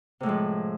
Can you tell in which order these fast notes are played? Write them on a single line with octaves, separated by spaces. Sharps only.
C3 A2 G#3 F3